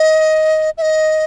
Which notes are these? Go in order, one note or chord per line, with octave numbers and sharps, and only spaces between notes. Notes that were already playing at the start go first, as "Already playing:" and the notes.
Already playing: D#5
E5
D#5